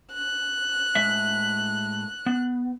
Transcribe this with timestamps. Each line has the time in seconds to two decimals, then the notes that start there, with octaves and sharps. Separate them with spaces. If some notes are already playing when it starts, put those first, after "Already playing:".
0.14 F#6
0.95 A2 G#3 E5
2.26 B3